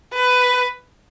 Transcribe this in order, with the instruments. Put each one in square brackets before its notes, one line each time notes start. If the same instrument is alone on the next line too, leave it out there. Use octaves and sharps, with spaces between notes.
[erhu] B4